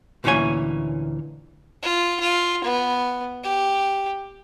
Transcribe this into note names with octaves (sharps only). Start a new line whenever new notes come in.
D2 A#2 E3 C#4 C#5 G#5
F4
F4
B3
G4